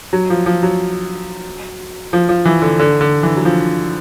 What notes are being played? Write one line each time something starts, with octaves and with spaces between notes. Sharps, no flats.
F#3
F3
F3
F#3
F3
F3
E3
D3
D3
D3
E3
F#3
F3